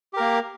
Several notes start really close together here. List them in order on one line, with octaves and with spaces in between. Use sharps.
G4 A#4 A#3